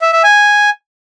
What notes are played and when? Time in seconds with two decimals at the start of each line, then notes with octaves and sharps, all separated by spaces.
0.02 E5
0.13 E5
0.24 G#5